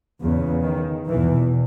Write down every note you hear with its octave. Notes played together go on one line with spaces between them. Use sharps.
E2 C#3
D#3
E2 B2 E3